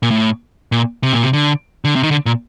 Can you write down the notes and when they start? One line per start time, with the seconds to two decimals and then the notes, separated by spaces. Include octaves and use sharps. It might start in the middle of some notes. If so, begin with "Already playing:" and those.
0.03 A#2
0.11 A2
0.72 A#2
1.03 C3
1.13 A#2
1.23 C3
1.33 D3
1.85 D3
1.96 C3
2.03 D#3
2.11 D3
2.26 A#2